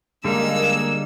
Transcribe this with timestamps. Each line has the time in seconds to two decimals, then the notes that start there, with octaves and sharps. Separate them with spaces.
0.24 D3 G3 G#3 A#3 D#4 E6